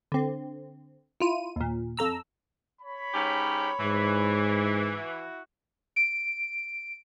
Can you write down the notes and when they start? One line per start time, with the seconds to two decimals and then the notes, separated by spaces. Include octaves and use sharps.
0.12 D3 C4
1.20 E4 F4 D#7
1.56 D#2 A#2
1.97 F2 A4 A#5 E6
2.81 C#5 B5
3.14 G#2 C#4 G4
3.80 G#2 E3
4.93 E4 F#4
5.96 D7